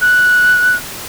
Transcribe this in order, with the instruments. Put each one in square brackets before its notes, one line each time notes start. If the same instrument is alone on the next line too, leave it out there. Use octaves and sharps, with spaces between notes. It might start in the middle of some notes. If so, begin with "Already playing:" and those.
[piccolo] F#6